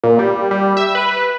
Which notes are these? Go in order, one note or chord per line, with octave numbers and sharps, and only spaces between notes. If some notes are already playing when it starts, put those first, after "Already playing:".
A#2
G3
G3
E5
B4